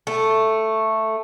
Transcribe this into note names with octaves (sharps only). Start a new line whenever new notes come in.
A3